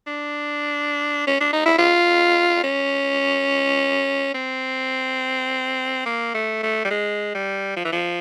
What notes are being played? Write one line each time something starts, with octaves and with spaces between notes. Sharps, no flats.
D4
C#4
D4
D#4
E4
F4
C#4
C4
A#3
A3
A3
G3
G#3
G3
F3
E3
F3